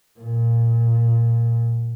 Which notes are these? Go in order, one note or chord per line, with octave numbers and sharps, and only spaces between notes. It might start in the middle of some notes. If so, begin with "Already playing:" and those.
A#2